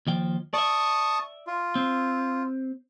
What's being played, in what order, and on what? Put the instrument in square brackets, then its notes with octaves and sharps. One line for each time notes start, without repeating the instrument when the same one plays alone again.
[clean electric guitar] D#2 F3 G5
[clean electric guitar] D5 E5 [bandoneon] A5 C#6 D#6
[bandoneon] F4
[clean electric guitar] C4